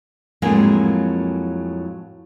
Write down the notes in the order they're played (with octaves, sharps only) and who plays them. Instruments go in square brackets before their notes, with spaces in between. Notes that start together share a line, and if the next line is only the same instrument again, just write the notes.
[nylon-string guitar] F2 A2 F#3 G#3 A#3 G#4